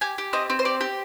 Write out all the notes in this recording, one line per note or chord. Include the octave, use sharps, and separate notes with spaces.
G4 G#5
G4
C4 D#5
C4
C5
G4 D5
G4